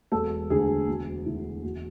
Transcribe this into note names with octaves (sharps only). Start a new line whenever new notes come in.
E1 A4
D2 D3 G#4
E1 F#4
D2 D3 E4
E1 F#4